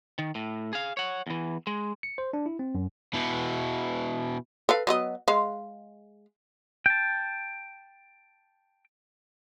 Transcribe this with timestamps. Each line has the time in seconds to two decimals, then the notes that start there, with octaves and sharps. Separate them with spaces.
0.19 D#3
0.35 A2
0.73 G#4 F5
0.97 C#5 F#5
1.27 E2 E3
1.67 G#3
2.03 C#7
2.18 C5
2.33 D4
2.46 E4
2.59 C4
2.75 F#2
3.14 B2 E3
4.69 A4 B4 F5
4.87 F#3 B3 D#5
5.28 G#3 F5
6.86 G5 A5